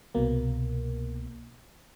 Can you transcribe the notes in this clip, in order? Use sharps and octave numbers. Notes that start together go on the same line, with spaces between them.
C2 B2 A#3